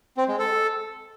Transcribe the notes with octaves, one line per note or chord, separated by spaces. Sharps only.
C4
G#3
A4